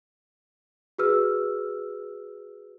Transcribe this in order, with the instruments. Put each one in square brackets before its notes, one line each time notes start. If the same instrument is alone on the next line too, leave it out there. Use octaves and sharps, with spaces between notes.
[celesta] F#4 G#4 B4 E6 F6